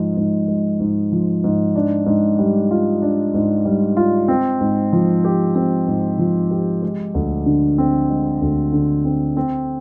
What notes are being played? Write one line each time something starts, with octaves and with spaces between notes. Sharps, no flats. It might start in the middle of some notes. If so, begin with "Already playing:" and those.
Already playing: G#2 F3 G#3
G#2
G#3
G#2
F3
G#2
D4
G#2
G3
F4
D4
G#2
G3
F4
C4
G#2
F3
G4
C4
G#2
F3
G4
G#3
D2
D3
C4
G#3
D2
D3
C4
C4